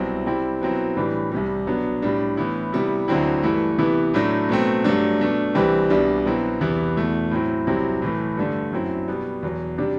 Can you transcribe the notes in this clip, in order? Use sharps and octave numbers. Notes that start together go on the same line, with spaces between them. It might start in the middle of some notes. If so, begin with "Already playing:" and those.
Already playing: C2 B2 F#3 C4 E4
C3 G3 C4 E4
B2 F#3 C4 E4
A2 E3 G3 D4
C2 C3 G3
B2 F#3 B3 D4
A2 G3 D4
A2 E3 B3 E4
C3 G3 B3 E4
D2 D3 F#3 C4 E4
G2 E3 A3 E4
C3 E3 B3 E4
A2 F#3 A3 D4
B2 F#3 A3 C4
G2 F#3 A3 D4
B2 A3 D4
C2 C3 E3 G3 C4
C2 B2 G3 D4
B2 F#3 C4 E4
E2 C3 E3 B3 E4
E2 B2 A3 E4
A2 F#3 C4 E4
C2 C3 F#3 C4 E4
A2 E3 A3
G2 D3 A3 D4
F#2 F#3 C4 E4
B2 G3 B3
E2 B2 F#3
C3 G3 D4